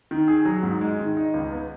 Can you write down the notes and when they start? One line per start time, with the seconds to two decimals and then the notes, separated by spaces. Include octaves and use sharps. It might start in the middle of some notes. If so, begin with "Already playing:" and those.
0.11 D#3
0.28 G#4
0.45 F#3
0.63 G#2
0.81 G#3
0.99 D#3
1.17 D#4
1.34 C#2
1.53 B3